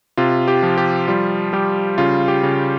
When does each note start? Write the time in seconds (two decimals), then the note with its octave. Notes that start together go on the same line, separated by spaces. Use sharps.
0.17 C3 F4
0.48 G4
0.63 F3
0.78 G4
1.08 G3 F4
1.53 G3 G4
1.98 C#3 F4
2.28 G4
2.43 C#3